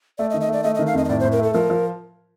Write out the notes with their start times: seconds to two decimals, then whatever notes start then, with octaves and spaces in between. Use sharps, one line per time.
0.18 A3 D5
0.30 D#5
0.34 D#3
0.41 D#5
0.49 A3 D5
0.64 A3 D#5
0.75 D#5
0.79 D#3
0.87 F5
0.94 F2 D#5
1.04 D#5
1.09 A2 D5
1.20 C5
1.24 A2
1.32 A#4
1.39 A3 A4
1.54 F3 A#4
1.70 F3